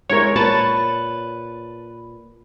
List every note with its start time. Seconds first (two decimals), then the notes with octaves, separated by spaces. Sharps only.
0.09 G#3 E4 A#4 C#5
0.36 A#2 B4 C#5 A5 A6